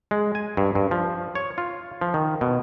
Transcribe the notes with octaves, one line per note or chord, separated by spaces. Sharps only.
G#3
G#5
G2
G2
F3
C#5
F4
F3
D#3
B2